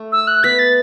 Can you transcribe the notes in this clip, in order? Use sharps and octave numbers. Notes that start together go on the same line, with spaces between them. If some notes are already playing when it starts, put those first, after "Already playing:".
Already playing: A3
E6
F#6
B3 B6
A6